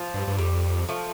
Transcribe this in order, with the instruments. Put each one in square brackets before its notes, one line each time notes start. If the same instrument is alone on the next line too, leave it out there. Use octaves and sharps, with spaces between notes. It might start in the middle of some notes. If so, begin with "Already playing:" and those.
Already playing: [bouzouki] F3
[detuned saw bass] G2
G2
[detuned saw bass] F2 [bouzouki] G3
[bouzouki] F3 A3